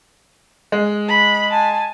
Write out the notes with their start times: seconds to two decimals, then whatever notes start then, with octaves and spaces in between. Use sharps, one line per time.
0.72 G#3
1.08 B5
1.51 G#5 A5